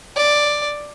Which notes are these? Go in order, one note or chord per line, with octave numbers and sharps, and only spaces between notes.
D5